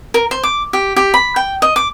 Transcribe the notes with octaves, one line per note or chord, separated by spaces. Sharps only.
A#4
C5
D6
G4
G4
B5
G5
D#5
D6